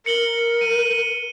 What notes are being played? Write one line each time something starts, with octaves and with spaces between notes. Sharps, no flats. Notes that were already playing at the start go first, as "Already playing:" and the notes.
A#4 C#7 F#7 G7
D#7